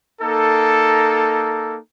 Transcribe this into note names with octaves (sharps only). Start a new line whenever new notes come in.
A#3 D#4 A4